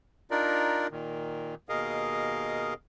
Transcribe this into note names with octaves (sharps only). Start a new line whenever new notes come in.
D4 D#4 F4 A#4 D5
A#2 D#3
D#2 B2 G#4 A#4 D#5 F5